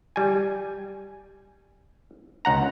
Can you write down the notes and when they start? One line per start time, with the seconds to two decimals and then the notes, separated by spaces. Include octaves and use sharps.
0.16 G3 G#5
2.45 C#2 F#5 A#5